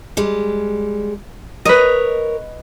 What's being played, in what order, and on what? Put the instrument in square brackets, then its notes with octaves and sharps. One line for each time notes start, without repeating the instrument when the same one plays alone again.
[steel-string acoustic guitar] G3 G#3
[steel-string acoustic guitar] A#4 C#5 [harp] B4 D#5